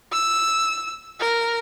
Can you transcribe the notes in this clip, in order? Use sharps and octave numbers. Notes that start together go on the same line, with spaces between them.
E6
A#4